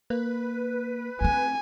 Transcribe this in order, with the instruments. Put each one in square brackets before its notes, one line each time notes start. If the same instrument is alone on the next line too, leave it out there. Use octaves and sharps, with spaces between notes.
[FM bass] A#3 [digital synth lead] B4
[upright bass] A3 C4 [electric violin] G#5